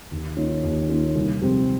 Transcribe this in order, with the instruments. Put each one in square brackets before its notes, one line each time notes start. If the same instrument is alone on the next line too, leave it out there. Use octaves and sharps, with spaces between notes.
[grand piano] D#2
D#3 A#3 C#4 F4
D#2
D#3 A#3 C#4 F4
C2
C3 F3 G#3 C4